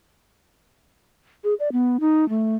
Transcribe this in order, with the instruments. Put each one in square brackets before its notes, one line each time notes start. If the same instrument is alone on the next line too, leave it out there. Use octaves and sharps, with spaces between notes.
[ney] G#4
D5
B3
D#4
A3